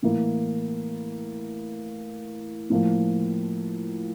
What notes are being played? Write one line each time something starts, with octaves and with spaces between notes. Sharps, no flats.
A2 E3 A#3 E4
A2 F3 A#3